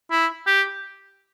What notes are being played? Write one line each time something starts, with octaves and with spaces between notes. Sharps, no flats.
E4
G4